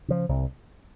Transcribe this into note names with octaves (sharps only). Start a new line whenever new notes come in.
C#3 F3
C2